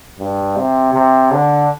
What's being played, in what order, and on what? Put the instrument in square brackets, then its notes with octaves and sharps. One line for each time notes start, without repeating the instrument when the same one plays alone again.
[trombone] G2
C3
C3
D3